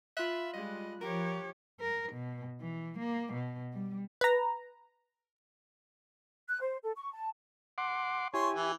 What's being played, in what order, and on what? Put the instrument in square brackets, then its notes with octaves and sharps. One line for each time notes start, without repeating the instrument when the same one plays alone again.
[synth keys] F4 B5 F#6 [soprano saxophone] E5
[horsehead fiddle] G3 G#3 [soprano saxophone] D#5
[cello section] F3 [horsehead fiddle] G4 C#5 [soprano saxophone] A#4
[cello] A#4
B2
E3
A#3
B2
G3
[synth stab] B4 A#5
[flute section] F#6
C5
A4
C#6
A5
[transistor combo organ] F#5 C6 D6
[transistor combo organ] E4 G4 G#5 [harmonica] C#5 C6
[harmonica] E3